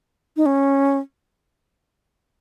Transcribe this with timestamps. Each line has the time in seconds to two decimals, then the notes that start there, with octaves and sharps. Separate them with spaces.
0.37 D#4
0.46 C#4